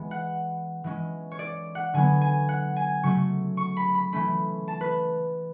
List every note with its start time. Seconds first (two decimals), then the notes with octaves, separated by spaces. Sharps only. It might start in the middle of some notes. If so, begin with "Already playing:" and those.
Already playing: E3 G#3 B3
0.11 F#5
0.84 E3 G#3 C#4
1.31 C#5
1.39 D5
1.75 F#5
1.93 D3 F#3 B3 G#5
2.21 G#5
2.49 F#5
2.76 G#5
3.03 C#3 F#3 A3 C#4 C#6
3.57 C#6
3.77 B5
3.95 B5
4.13 E3 A3 C#4 B5
4.68 A5
4.81 B4